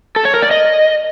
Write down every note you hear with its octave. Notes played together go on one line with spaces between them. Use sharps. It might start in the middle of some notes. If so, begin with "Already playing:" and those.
A4
C#5
A#4
D5
D#5